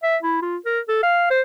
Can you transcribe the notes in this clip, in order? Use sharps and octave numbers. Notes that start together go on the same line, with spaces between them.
E5
E4
F4
A#4
A4
F5
C5